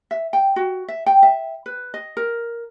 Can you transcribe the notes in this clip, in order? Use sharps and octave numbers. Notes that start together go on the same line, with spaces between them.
E5
G5
F#4
E5
G5
E5
B4
D#5
A#4